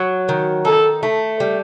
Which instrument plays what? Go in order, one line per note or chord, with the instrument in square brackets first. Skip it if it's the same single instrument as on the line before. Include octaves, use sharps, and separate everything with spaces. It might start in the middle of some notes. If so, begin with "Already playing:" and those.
Already playing: [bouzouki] F#3
D#3
[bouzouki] D#4 [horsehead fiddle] A4
[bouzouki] A3
G3